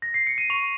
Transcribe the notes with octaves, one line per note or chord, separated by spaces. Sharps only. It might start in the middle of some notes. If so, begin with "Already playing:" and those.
A#6
C7
C#7
D#7
C#6 F7